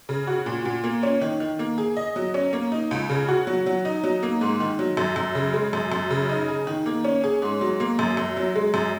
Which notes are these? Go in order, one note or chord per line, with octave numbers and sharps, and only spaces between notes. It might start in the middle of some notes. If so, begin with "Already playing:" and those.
C#3
F#4
A#2
A#2
A#3
C#4
D#3
D#3
A#3
G#4
D#5
F#3
C#4
A#3
D#4
C#2
C#3
F#4
F#3
F#3
D#4
F#3
A#3
G#2
D#3
F#3
F#2
F#2
C#3
G#3
F#2
F#2
C#3
D#4
G#4
D#3
A#3
C#4
G#4
G#2
F#3
A#3
F#2
F#2
F#3
G#3
F#2